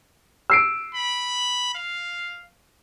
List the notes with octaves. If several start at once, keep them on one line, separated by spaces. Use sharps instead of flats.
E6 C7 D7
B5
F5